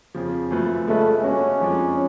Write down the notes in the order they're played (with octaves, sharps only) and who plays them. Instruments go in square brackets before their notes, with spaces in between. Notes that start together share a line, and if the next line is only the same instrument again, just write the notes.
[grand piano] F2 C#3 F3
F#2 F3 A3 F4 B4
[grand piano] C#3 G#3 C#4 F4 B4 [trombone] A3
[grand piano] G#3 B3 D4 F#4 [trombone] C#4
[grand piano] F2 F3 G#3 D4